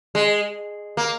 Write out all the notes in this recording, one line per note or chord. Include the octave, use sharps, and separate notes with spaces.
G#3
A#3